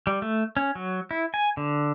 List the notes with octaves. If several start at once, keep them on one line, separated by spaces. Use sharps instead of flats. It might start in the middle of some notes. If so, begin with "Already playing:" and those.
G3
A3
C#4
F#3
E4
G#5
D3